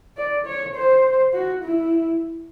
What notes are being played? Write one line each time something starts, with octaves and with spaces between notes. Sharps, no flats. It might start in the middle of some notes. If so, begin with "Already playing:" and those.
D5
C#5
C5
F#4
E4